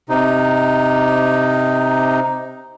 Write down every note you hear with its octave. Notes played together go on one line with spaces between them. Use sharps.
C3 D#4